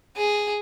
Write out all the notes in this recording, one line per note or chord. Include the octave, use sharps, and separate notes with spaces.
G#4